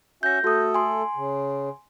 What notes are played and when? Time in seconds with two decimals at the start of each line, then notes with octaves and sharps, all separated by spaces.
0.23 C#4 F#4 E5 G6 A#6
0.44 A3 F#4 A4 D#6
0.74 G#5 C6
1.15 C#3